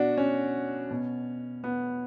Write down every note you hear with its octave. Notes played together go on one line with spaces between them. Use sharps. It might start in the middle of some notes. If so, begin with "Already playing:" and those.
Already playing: B2 D4 F#4
C#4
B2
B3